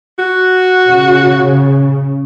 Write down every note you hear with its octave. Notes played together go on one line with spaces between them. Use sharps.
F#4
C#3